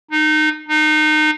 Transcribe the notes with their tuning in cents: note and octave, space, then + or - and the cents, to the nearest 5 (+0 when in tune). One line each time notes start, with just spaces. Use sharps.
D#4 -20
D#4 -25